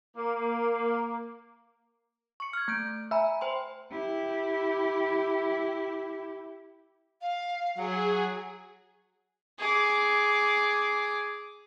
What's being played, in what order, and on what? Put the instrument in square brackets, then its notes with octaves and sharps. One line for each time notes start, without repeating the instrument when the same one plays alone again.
[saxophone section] A#3
[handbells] C#6 C#7
F6 G#6
A3 G6 D7
[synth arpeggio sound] E5 [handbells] G#5 A#5 B5
[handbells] C5 G5 C6
[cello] E4 G4
[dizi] F5
[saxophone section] F#3 [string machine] G#4 [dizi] F#5
[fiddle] G#4 D6